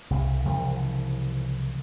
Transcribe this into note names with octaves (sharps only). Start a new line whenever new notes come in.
C2 C#3
C2 C#3 E3 F3